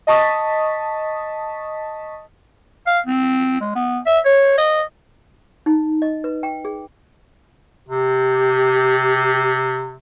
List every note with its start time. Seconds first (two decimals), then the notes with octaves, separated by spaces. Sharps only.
0.07 D#5 A5 C#6 D#6 A6 B6
2.86 F5
3.06 C4
3.61 G#3
3.75 B3
4.06 E5
4.25 C#5
4.57 D#5
5.66 D#4
6.02 D#5
6.24 B4
6.43 G5
6.65 G#4
7.89 C3 G4